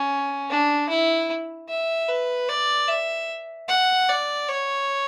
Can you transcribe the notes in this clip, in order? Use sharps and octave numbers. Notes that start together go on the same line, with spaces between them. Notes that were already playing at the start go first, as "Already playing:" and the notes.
Already playing: C#4
D4
E4
E5
B4
D5
E5
F#5
D5
C#5